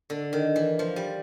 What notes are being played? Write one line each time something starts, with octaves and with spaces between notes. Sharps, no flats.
D3
D#3
E3
F3
G3